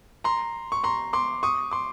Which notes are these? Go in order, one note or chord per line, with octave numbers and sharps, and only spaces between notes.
A#5 C6
C#6
A#5 C6
C6 D6
C#6 D#6
C6 D6